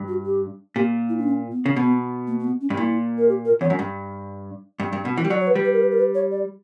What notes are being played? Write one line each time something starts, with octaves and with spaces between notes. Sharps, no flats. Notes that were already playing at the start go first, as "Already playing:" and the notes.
Already playing: G2
F#4
G4
A#2 G4
E4
D4
C#4
B3
C#3
B2 B3
A#3
A#3
B3
C#4
G2
A#2 E4
A#4
G4
A#4
E2 C#5
F#2
G2
G2
G2
B2
E3
G3
F#3 D5
C#5
B4
G3
B4
A#4
B4
A#4
B4
C#5
D5